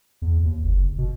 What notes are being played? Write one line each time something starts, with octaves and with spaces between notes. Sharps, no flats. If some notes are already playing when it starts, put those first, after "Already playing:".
E2
D#2
F#1
B2